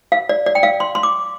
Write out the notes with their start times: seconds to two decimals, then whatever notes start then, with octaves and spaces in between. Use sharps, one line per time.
0.12 F5
0.29 D5
0.46 D5
0.55 G5
0.63 F5
0.80 C6
0.95 C6
1.03 D6